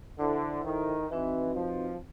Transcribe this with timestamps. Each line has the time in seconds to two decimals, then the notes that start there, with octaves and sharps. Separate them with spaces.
0.18 D3 E4 A4 C5 E5
0.64 D#3
1.09 E3 C4 D#4 F#4 B4 D#5
1.54 F3